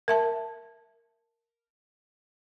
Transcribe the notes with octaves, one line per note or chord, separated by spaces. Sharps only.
A#4 E5 A5